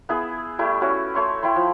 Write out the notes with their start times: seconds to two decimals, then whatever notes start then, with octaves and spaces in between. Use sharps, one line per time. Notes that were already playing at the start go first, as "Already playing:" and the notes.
0.09 B3 E4 G#4 B4
0.59 G3 A3 E4
0.81 C#4 F#4 B4 C#5
1.15 A3 C#5 C6
1.43 E4 G5 B5 C6
1.56 F3